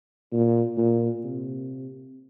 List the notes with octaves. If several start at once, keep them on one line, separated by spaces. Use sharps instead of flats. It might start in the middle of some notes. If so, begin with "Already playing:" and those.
A#2
A#2
C3